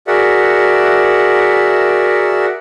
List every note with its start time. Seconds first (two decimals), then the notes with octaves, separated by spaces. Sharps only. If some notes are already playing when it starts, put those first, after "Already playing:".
0.07 F#4 G#4 A#4 D5 E5 F#5